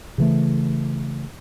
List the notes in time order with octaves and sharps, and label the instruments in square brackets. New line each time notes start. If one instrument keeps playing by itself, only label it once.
[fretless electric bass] C#3 E3 A3